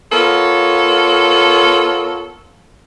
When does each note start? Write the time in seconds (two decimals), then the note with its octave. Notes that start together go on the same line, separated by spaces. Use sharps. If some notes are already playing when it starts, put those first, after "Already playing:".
0.11 B3 F4 A4 A#4 C#5